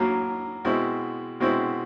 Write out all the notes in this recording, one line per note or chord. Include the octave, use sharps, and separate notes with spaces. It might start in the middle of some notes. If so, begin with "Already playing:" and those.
Already playing: A2 F#3 A#3
B2 G#3 C4 E4
B2 G#3 C4 E4